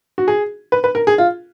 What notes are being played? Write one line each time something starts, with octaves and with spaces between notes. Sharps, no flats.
F#4
G#4
B4
B4
A#4
G#4
F4